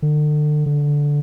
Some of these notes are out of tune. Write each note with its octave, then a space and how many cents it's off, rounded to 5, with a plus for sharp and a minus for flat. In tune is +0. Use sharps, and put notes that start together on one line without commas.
D3 +35
D3 -10